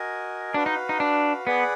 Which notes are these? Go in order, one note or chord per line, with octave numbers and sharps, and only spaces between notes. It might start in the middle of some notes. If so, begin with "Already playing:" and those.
Already playing: F#4 A#4 D#5 G#5
D4 F#4 B4 F5
D#4
D#4
D4
B3 G#4 B4 D5 F#5